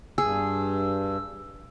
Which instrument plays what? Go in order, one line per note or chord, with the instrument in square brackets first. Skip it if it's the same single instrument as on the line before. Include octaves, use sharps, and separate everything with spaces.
[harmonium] G2 [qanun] G#4 [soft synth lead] E6